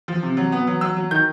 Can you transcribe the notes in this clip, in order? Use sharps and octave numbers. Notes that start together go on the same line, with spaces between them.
F3
C3
F#3
B3
F#3
F#3 E6
F#3
D#3 G6